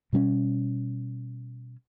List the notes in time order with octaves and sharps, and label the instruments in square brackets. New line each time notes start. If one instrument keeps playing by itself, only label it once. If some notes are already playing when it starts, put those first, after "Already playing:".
[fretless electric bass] B2 G3 C4 C#4